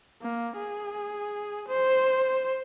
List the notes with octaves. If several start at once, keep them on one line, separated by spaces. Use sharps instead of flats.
A#3
G#4
C5